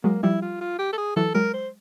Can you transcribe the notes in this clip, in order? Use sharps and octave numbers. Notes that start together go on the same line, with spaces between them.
F#3 G#3 A#3
F3 G3 E4
F4
F4
G4
A4
G#4
E3 F#3 A4
F#3 G#3 A#4
C5